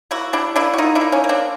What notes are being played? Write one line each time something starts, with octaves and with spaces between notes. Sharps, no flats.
A#3 E4 F#4
G3 D4 E4
A#3 D4 E4
F#4
A#3 D#4 F4
D4 E4
A#3
C#4 D#4
A#3
C4 D4